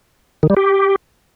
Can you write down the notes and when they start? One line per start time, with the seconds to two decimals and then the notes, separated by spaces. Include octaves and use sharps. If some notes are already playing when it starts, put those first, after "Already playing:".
0.43 D#3
0.50 G3
0.57 G4